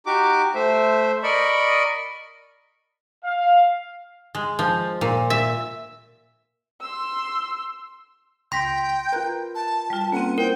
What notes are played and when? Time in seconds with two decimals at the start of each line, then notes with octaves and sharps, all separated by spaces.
0.06 D#4 F#4 G4 D6
0.55 A3 C5 E5
1.23 A#4 D5 D#5 B5 C#6
3.25 F5
4.35 G#3
4.59 F3
5.01 A#2
5.30 E5
6.81 C6 E6
8.52 C#2 G5 C6 A#6 B6
9.13 F4 A#4 B4 A#5 F#6
9.55 A5
9.90 G3 F4
10.12 A#3 C4 C#4 A4 B4 F#5
10.38 E4 A#4 C5 G5